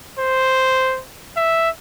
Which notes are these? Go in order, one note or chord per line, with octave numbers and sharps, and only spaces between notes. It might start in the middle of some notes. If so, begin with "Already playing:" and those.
C5
E5